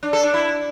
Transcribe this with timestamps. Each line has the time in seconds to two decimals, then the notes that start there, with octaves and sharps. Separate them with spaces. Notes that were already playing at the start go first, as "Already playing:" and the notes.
0.03 D4
0.13 A4
0.23 D4
0.34 E4